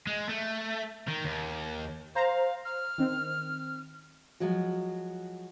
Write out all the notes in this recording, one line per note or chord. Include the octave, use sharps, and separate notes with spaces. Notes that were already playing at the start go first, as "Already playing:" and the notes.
G#3
A3
D#3
D#2
C5 F5 A#5
F6
D#3 C4
F3 F#3 G#3 F#4